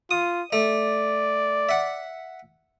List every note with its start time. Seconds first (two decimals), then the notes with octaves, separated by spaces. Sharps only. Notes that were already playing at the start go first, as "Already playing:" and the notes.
0.11 F4 D#6
0.53 A3 D5
1.69 E5 F#5